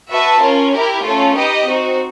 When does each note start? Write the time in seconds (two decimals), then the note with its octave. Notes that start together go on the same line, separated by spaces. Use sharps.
0.09 F#4 B4 E5 A5
0.41 C#4 F4 A#4
0.72 E4 G4 A#4
1.03 A3 C#4 F4 A4
1.34 D#4 G4 B4 D#5
1.65 C4 D#4 F#4